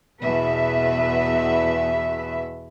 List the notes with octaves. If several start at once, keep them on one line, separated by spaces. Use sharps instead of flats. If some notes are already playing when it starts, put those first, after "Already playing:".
E2 B2 B4 E5